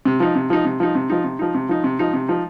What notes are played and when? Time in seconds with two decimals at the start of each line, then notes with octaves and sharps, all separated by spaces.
0.05 C3
0.20 F3 D#4
0.35 C3
0.50 F3 D#4
0.65 C3
0.80 F3 D#4
0.95 C3
1.10 F3 D#4
1.24 C3
1.39 F3 D#4
1.55 C3
1.69 F3 D#4
1.84 C3
1.99 F3 D#4
2.14 C3
2.28 F3 D#4